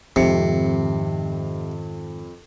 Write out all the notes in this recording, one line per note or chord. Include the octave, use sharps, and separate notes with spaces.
F2 G#2 C3 D#3 C#7